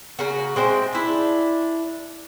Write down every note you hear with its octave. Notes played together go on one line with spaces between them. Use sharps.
C#3 A#3 F#4
G#3 C4 E5
D4 E4